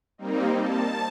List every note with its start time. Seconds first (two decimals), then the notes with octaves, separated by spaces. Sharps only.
0.18 G3 A#3 C4 D#4
0.57 A5